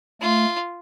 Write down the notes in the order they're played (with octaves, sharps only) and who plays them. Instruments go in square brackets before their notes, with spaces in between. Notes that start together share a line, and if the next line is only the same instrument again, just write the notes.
[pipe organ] A3 [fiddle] F4